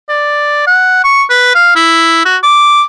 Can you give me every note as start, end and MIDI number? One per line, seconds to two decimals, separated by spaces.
0.09 0.66 74
0.67 1.01 78
1.04 1.23 85
1.30 1.54 71
1.55 1.72 77
1.76 2.24 64
2.26 2.37 66
2.43 2.83 86